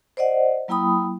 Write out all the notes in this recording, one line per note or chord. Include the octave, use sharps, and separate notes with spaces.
C5 D5 D#5 F#5
F#3 A#3 E4 G5 B5 D#6